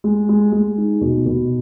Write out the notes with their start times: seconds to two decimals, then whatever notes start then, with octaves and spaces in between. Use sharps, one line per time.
0.04 G#3
0.29 G#3
0.52 G#3
0.78 D#4
1.01 B2
1.26 B2